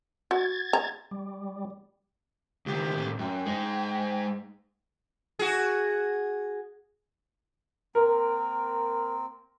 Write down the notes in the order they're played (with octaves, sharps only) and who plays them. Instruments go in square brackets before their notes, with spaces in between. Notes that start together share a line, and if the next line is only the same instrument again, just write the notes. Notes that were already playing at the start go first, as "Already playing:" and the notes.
[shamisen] F#4 [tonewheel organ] G#6 A6
[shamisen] A#5
[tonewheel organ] G3
[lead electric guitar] C#2 D#3 [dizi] G4
[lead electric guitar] A2 D#3
[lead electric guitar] F#2 [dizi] G5
[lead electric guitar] G#3 D#4
[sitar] F#4 G#4
[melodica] A#3 C4 [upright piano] A#4